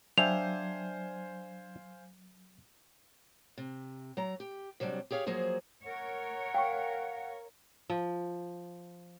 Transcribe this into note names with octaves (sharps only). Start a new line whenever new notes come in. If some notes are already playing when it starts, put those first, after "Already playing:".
F#3 D4 C5 E5 F5 G5 G#5 F7
C3
F#3 A#5
G4
C3 F#3 G3 D4
G4 G#4 C#5 F5
F3 F#3 A#3 G#4 C5
A#4 C#5 F#5
F5 G5 C#6
F3